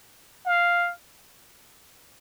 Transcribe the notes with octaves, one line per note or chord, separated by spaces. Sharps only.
F5